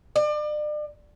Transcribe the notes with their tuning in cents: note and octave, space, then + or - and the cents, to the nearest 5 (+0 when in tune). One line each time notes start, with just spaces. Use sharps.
D5 +35